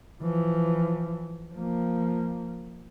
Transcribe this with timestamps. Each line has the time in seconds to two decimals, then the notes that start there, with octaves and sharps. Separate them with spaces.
0.22 E3 F3
1.54 F3 A#3